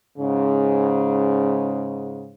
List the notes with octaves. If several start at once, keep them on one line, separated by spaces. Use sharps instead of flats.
G#2 C#3